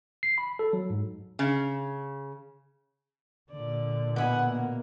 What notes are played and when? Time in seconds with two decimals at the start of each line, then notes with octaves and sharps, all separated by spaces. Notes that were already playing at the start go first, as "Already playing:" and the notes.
0.23 C7
0.38 B5
0.59 A4
0.73 F#3
0.90 G#2
1.39 C#3
3.51 A#2 D3 D5
4.16 B2 E4 E5 F#5 G#5
4.48 A#3